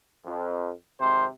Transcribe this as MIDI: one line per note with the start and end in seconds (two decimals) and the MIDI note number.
0.25 0.70 41
1.00 1.25 32
1.00 1.25 48
1.00 1.25 72